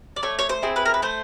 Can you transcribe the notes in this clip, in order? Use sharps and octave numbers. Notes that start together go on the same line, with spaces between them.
D5
A3 C#5
C#5
C5
C4 E4 G#4
B4
A#4
B4
A3 C5